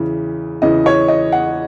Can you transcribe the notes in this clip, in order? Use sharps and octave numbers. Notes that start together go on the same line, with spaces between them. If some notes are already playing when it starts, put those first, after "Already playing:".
Already playing: E2 C#3 E3
E2 C#3 E3 D#5
C#5
D#5
F#5